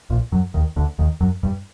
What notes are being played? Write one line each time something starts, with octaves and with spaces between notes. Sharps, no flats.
A#1 A#2
F#2 F#3
D#2 D#3
D2 D3
D#2 D#3
F#2 F#3
G2 G3